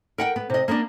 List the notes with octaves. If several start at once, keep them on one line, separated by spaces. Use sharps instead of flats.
A#4 F#5 G5
B3
C3 D#5
A#3 B3 C#4 D4